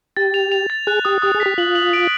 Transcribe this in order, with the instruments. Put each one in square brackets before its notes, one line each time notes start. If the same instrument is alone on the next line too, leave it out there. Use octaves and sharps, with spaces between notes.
[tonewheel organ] G4 [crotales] A6
[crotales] F7
F7
A6
[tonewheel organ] G#4 [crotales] F#6
[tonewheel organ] G4 [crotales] D#6
[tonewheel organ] G4 [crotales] D#6
[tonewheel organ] G#4
[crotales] B6
[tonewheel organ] G4
[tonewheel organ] F4 [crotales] F#7
[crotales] F#7
D7